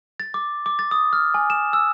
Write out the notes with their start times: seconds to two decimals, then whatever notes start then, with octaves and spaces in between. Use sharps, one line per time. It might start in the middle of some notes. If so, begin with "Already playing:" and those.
0.20 A6
0.34 D6
0.66 D6
0.79 A6
0.91 D#6
1.13 F6
1.34 G#5
1.50 E7
1.73 E6